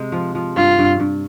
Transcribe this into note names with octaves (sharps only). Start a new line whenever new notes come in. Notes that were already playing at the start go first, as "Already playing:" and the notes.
Already playing: C3 G#3
F3
F3
G2 F4
G2
G2